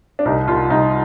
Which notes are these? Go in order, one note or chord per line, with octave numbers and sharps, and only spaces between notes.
D4
C2 D#4
C2 F4
C2 D#4